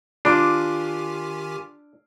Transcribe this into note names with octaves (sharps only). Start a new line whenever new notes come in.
D#3 D4 F4 G4 G#5 C6 D6